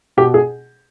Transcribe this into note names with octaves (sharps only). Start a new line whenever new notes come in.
B2 G4
G#4